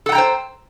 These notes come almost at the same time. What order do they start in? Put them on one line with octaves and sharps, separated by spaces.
A4 F#5 A#5 G5 C5